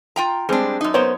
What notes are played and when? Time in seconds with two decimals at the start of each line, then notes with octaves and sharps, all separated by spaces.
0.16 F4 G5 A#5
0.49 G3 G#3 C4 D4
0.81 F#2 D#4
0.94 B3 A#4 C5 C#5